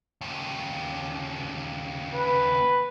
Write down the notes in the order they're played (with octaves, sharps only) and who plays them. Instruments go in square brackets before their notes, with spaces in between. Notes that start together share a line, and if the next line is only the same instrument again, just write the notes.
[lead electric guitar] D#2 C#3
[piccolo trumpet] B4